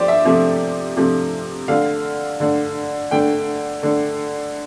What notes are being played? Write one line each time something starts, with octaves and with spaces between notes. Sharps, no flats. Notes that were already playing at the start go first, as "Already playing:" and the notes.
Already playing: F3 A3 G4 C5 D5
E5
C3 F3 A3
C3 F3 A3
D3 A3 F5
D3 A3
D3 A3 G5
D3 A3